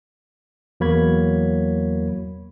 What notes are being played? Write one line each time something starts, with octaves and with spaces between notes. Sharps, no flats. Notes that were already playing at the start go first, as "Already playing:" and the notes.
E2 F#3 A#3 C#5 B5 G#6